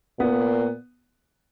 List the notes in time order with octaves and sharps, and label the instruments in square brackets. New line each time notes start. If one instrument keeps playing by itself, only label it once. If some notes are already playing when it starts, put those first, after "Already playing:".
[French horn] A#2 [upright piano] B3